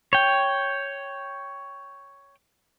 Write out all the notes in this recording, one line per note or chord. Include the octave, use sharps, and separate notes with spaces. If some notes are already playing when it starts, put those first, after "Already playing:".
C#5 G5